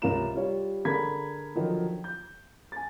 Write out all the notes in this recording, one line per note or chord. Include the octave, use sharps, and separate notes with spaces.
C#2 C3 C#4 F4 A#4 E7
G3 F4 C#5
D3 G#4 A#4 B5 G#6 B6
D3 D#3 F3 F#3 D#4
G6
G#5 A6